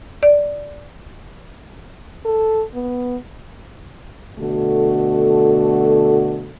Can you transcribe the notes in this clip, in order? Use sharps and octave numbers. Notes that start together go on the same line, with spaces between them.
D5
A4
B3
B2 D3 A3 F#4 A4